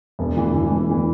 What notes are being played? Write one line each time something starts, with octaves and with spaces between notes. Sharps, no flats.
E1
E3
E3
E1
E3